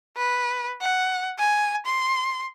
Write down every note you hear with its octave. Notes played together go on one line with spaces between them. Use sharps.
B4
F#5
G#5
C6